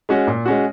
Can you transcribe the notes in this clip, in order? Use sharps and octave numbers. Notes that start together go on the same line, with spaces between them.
G#3 C#4 F#4
A#2
G#3 C#4 F#4